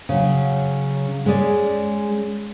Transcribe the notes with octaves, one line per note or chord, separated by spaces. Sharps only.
C#3 F#3
G#3 C#4 G#4 D5